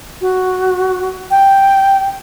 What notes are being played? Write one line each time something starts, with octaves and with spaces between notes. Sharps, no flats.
F#4
G5